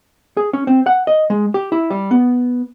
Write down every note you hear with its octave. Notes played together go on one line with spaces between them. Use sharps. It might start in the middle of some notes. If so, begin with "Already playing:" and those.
G#4
C#4
C4
F#5
D#5
G#3
G4
E4
G3
B3